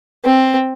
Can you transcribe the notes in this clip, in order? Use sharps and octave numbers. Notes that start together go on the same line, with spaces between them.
C4